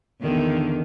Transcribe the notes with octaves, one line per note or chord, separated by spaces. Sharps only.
E2 D3 D#3